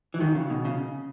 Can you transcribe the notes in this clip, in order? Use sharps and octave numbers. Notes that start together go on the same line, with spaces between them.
E3
D#3 F#3
C#3
B2
C#3